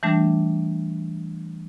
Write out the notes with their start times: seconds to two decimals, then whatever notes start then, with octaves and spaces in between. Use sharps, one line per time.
0.03 E3 G3 A3 D4